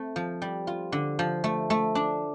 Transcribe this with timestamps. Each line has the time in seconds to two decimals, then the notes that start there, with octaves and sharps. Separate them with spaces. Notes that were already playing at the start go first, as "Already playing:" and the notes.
Already playing: A3 C4
0.16 F3
0.42 G3
0.67 F4
0.92 D3
1.19 F3
1.44 A3
1.70 A3
1.95 D4